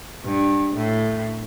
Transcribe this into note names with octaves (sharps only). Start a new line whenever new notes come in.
G2
A2